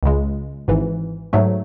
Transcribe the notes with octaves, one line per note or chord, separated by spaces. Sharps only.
C#2 C#3 G#3
G#1 G#2 E3
G#2 F#3 A3